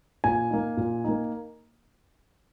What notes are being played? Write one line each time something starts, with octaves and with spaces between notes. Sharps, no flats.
A#2 G#5
A#3 D#4
A#2
A#3 D#4